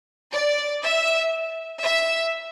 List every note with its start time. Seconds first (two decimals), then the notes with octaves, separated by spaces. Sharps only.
0.32 D5
0.82 E5
1.82 E5